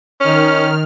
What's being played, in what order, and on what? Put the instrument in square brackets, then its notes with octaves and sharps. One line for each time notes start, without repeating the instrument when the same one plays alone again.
[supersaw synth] D#3 F6 [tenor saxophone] C#4